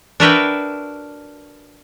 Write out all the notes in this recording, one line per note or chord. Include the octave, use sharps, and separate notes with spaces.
D4 F#4 A#4 B4 E5 G5